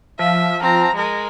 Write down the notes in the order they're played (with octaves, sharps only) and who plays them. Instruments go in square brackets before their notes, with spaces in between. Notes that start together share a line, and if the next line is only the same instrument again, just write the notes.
[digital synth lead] F3 [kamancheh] E5
[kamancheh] C4 A#5
G#3 A#4